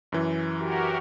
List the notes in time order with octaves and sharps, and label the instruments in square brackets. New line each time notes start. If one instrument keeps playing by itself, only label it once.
[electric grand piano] F#2 E3
[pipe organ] F#4 G4 A#4